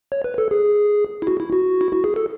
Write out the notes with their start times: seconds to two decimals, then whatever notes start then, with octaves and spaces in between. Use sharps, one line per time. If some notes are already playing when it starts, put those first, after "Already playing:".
0.12 C#5
0.24 B4
0.38 A4
0.51 G#4
1.22 E4
1.27 F#4
1.40 E4
1.53 F#4
1.81 E4
1.93 F#4
2.04 G#4
2.16 A4